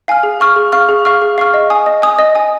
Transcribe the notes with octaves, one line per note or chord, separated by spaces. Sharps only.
F5 G#5 F6
G#4
F5 C#6 F6
G#4
F5 C#6 F6
G#4
F5 C#6 F6
G#4
F5 C#6 F6
D#5
G#5 D#6
D#5
G#5 D#6
D#5
G#5 D#6